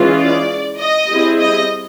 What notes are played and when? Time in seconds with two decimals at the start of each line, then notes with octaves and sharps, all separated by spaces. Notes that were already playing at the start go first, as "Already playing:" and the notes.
Already playing: E3 G#3 C#4 F4 G#4
0.17 D5
0.79 D#5
1.08 G3 C4 E4 G#4
1.40 D#5